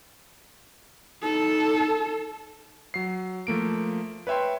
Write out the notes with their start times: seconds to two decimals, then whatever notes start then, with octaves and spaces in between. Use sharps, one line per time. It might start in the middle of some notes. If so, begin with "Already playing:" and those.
1.23 D#4 A4
2.94 F#3 C7
3.47 F3 A3 A#3 D7
4.27 B4 C#5 E5 G5 C6